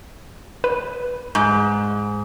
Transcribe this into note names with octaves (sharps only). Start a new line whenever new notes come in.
B4
G#2